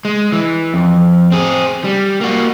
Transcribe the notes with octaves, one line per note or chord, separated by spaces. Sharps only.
G#3
E3
F2
C4 G#4
G3
A#3 F#4